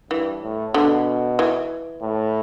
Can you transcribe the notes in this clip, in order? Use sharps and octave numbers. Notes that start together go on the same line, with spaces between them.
G2 E3
A2
B2 D3
E3
A2